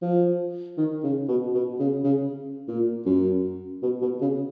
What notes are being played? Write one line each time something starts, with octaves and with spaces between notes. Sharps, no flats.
F3
D#3
C#3
B2
B2
C#3
C#3
A#2
F#2
B2
B2
C#3